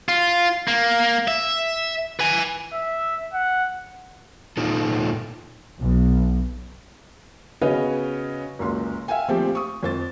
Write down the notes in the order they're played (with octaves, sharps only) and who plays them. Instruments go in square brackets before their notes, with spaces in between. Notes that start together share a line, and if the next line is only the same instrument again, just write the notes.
[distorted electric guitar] F4
A#3
E5
B4 G#5
[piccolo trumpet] E5
F#5
[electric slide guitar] A#2 D#4 F4 A4
[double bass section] B1
[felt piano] C#3 B3 F#4 B4 C#5 D#5
F#1 C#2 C6
E5 F5 G5 G#5
A#2 F3 A3 C4 G4
C#6 D#6
F2 C5 A6